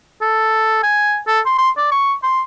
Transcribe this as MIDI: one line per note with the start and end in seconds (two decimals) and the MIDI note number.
0.22 0.81 69
0.83 1.19 80
1.27 1.40 69
1.46 1.57 84
1.59 1.70 84
1.77 1.91 74
1.92 2.14 85
2.23 2.41 84